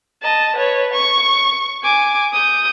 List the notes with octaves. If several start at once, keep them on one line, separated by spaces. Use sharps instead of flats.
D#5 A5
B4 C#5
C#6
G#5 D6
D#6 G6